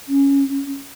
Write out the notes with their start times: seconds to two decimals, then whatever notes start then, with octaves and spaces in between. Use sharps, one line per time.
0.08 C#4